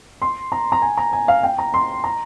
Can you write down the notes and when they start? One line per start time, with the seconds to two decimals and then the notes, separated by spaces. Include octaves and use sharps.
0.22 C6
0.52 A#5
0.72 A#5
0.82 G#5
0.97 A#5
1.13 G#5
1.28 F5
1.43 G5
1.59 A#5
1.74 C6
2.04 A#5